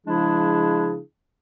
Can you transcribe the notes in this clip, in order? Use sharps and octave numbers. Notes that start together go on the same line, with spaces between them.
C#3 F3 G#3 D4 E4 G#4